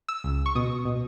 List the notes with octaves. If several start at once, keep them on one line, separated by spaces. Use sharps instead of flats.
E6
C#2
C#6
B2 D#6
B2